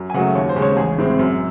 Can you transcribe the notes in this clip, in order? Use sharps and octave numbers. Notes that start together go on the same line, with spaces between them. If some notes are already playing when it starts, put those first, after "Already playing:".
Already playing: F#2
G#5
C#3 F#3 A3 F#5
D#2 C#5
C5
C#3 G#3
C#5
A1 G#4
A2 G#3 C4
F#2